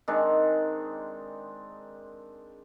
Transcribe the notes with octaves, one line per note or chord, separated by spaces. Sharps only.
D#3 G#3 C4 D4